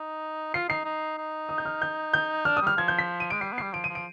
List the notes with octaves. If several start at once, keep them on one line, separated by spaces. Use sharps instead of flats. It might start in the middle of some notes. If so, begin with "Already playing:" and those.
Already playing: D#4
F4 C7
D#4 C7
D#4
D#4
D#6
G6
F6
G6
G6
D4 F6
D#6
G3 F6
F3 G#6
G6
B6
D#7
G#3 D7
G3 C7
B3
G3 C7
F3 D7
D#7
F3
D7